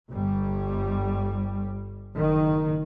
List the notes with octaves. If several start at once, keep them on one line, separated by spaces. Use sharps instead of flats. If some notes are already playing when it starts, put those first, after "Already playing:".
G1 G3
F#1 D#3